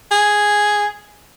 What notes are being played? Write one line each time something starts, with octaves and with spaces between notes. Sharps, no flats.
G#4